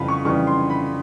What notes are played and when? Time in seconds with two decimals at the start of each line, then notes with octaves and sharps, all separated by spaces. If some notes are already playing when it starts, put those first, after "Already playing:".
Already playing: F2 C#3 E3 G3 F5 B5
0.08 C#6
0.25 F2 C#3 E3 G3 C#6
0.47 C6
0.70 B5